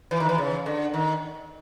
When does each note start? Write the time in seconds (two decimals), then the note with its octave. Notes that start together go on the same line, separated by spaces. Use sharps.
0.11 E3
0.20 D#3
0.29 E3
0.38 C#3
0.66 D3
0.94 D#3